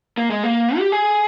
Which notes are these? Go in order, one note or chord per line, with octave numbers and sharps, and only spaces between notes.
A#3
G#3
A#3
G4
G#4